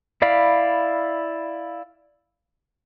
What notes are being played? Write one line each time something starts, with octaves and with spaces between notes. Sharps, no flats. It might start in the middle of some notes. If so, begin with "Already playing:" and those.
E4 D5 F5 B5